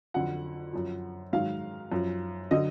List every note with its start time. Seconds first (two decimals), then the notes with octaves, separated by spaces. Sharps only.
0.14 F2 D3 F#3 F#5
0.73 F#2 F3
1.33 G#2 D#3 F#3 F5
1.92 F#2 F3
2.51 D3 F#3 D#5